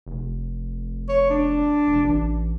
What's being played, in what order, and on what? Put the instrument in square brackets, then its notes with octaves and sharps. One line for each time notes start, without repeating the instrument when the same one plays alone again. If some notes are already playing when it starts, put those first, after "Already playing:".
[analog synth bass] F1
[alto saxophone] C#5
D4
[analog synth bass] F1
A1